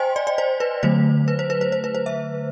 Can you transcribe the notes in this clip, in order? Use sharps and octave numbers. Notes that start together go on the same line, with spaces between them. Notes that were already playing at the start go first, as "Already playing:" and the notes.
Already playing: C5 D#5 G5 G#5 C6
D5
D5
C5
B4
D3 F#3 A3 C5
B4
C5
B4
C5
C5
B4
C5
E5